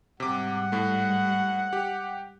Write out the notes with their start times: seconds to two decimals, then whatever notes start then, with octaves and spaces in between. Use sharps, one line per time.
0.20 G#2 C3 G3 F#5 D6
0.72 A2 A3
1.73 G4